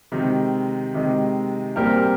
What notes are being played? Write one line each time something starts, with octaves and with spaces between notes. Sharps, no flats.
C3 D#3 G#3
C3 D#3 G#3
A#2 G3 C4 G4 A#4